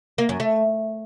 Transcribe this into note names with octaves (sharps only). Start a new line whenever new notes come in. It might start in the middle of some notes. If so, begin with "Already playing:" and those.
A#3
F#2
A3